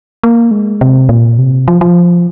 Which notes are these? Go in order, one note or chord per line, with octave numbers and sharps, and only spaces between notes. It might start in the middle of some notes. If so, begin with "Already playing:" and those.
A#3
G#3
C3
A#2
C3
F3
F3